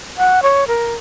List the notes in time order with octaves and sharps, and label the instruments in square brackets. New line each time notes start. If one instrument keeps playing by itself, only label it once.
[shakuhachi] F#5
C#5
A#4